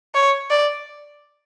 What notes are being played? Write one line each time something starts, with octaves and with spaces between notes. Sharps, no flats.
C#5
D5